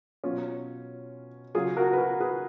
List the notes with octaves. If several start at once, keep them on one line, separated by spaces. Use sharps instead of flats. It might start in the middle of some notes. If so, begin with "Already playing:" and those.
B2 F#3 C#4 F4
C#3 F#3 F4 G#4
F#4 A#4
B4
F#4 A#4
G#4 B4